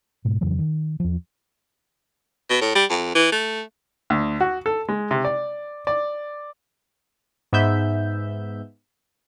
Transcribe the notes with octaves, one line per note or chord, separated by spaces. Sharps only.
G#2 B2
F2 C#3 E3 F#3
D#3
E2 F3
B2
A2
G3
F2
E3
A3
D2
F#4
A4
G#3
C3
D5
D5
G#2 B3 E5 G6